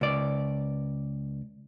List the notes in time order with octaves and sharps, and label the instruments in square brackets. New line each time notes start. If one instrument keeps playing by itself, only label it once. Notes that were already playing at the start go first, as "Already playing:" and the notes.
[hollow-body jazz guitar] C#2 D5